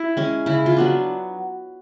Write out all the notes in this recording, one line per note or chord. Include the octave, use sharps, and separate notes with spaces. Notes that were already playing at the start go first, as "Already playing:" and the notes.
Already playing: E4
G#3 C#4
C#3 E4
F4
F#3 B3 D4